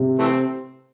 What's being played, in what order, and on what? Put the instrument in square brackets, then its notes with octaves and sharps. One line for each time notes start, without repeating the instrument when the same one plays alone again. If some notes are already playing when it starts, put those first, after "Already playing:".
Already playing: [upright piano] C3
[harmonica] E3 A3 C4